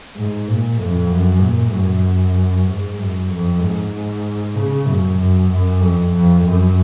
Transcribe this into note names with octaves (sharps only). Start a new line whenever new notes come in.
G#2
A#2
F2
F#2
A#2
F#2
G#2
F#2
F2
G#2
C#3
F#2
F#2
F#2
F2
F2
F#2